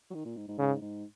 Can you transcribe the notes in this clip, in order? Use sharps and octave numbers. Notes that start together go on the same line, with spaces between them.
F#3
D#3
A#2
G#2
G#2
G#2 C#3
G#2